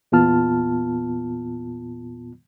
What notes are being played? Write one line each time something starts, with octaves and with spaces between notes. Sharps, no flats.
E2 A#2 B3 F4 A5 F6